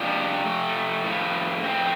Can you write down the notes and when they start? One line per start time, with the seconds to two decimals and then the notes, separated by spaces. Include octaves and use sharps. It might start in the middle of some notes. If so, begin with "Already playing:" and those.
Already playing: F2 C3 F3 D4
0.46 A3
1.04 A2 F3
1.63 C4